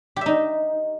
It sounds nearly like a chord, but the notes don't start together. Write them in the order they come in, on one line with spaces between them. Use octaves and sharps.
G4 E5 D#4